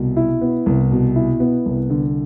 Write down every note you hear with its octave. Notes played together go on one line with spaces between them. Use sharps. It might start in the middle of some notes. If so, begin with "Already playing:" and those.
Already playing: C2 B2
E4
B3
C2
B2
E4
B3
C2
D3